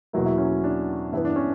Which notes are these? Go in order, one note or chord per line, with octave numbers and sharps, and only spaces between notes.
E2 B2 F#3 A#3 E4
E4
C#4
D4
G2 E3 B3 E4
D4
C#4